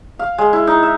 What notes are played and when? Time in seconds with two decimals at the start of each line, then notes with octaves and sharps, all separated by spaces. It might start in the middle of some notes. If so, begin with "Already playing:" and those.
0.19 F5
0.38 G#3
0.53 E4
0.67 D#4
0.83 E5